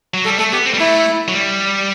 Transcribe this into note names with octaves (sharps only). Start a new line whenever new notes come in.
F#3
G3 A4
A3 A4
B3 G4
C4
G3
A3 E4
F#3
G3